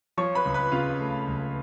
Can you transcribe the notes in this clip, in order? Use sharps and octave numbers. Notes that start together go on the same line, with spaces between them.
F3 C#5 C#6
B4 B5
C#2
B4 B5
C#3 F4 F5
A3
C#2